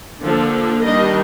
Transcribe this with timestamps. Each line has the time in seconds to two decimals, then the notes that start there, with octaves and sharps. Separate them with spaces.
0.22 D3 F3 A#3 D4 A4
0.83 D#3 G3 D4 D#5